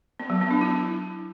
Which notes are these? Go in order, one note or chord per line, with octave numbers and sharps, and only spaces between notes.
B3
F#3
B3
D4
E4